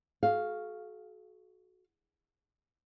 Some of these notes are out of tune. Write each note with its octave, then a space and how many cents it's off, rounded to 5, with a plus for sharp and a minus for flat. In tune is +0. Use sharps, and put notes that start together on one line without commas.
F#4 +0 A4 -45 F5 +0